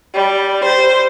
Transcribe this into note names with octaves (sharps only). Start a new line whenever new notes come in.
G3
C5